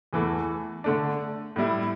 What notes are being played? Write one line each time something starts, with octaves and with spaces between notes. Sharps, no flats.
E2 E3 A3
D3 A3 D4
A2 G3 E4